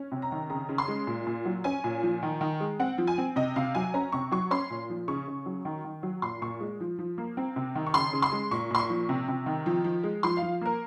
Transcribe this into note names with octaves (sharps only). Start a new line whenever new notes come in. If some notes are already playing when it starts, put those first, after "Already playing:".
Already playing: C#4
C3
A#5
D#3
C#3 A#5
C#3
C6
G#3
A#2
A#2
F#3
C#4 G#5
A#2
F3
D#3
D#3
G#3
C4 F#5
F3
G#5
C4
C3 D#5
C3 F5
F#3 G#5
C#4 A#5
C3 C#6
F#3 C#6
C#4 C6
A#2
F3
C#3 C#6
C#3
F#3
D#3
D#3
F#3
A#2 C6
A#2 C#6
G#3
F3
F3
A#3
C4
C3
D#3
C#6
C#3 C6
C#3
C6
G#3
A#2 C#6
A#2 C6
C#6
F3
C3
C3
D#3
F3
F3
G#3
F3 C6
F5
F3
A#3 A#4